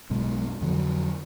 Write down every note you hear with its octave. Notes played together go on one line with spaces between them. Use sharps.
B1 F#2 B2 G#3
F2 D3 F#3